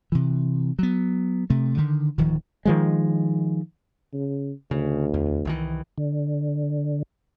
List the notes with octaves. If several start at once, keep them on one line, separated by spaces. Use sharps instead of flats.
C3 E3
F#3 B3
C3 A3
D3 D#3
D1 D#3 F3
D#3 F3 G#3
C#3
D2 C#3
E2
C2 D#3 E3
D3